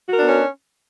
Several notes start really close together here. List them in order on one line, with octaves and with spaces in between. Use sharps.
F#4 A#4 D4 B3 C#4